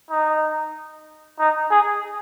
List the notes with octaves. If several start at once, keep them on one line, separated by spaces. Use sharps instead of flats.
D#4
D#4
G#4